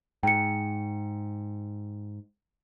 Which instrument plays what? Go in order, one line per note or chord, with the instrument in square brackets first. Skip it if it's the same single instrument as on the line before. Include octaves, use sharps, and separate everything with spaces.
[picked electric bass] G#2 [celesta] G5 C#7